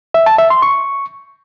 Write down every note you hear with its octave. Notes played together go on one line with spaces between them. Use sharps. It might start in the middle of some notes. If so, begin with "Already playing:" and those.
E5
A5
E5
C6
C#6